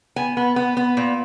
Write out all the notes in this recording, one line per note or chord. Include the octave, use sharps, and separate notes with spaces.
B3 G#5
B3
B3
B3
A#2